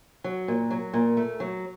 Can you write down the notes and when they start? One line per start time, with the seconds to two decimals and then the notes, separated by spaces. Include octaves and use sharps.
0.24 F#3
0.48 A#2
0.70 F#3
0.93 A#2
1.17 A3
1.40 F#3